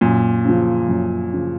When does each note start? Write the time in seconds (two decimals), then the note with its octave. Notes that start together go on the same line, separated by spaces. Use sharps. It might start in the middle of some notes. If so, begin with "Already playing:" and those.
0.01 F#2 A#2
0.44 C#3 F3
0.89 F#2
1.33 C#3 F3